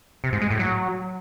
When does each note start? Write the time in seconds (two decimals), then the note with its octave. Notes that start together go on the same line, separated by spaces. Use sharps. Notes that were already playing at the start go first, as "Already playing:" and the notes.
0.24 C3
0.33 G#2
0.42 G#3
0.50 A2
0.59 F#3